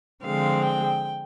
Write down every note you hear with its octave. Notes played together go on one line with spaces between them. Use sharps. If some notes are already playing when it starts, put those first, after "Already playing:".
D3 F3 G#3 C4 F5
G5